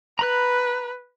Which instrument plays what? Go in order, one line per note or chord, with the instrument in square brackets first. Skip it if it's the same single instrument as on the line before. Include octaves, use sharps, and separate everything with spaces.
[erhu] B4 [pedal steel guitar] A#5 B5 F#6